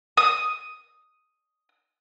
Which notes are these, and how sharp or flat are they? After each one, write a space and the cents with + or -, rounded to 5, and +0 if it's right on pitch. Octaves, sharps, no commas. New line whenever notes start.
D#6 +5